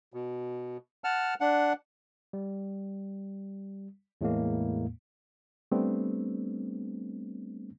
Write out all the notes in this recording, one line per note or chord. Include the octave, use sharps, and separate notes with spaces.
B2
F#5 A5 F6
D4 F#5
G3
E2 A2 G#3 A#3
G3 A3 B3 C4 D4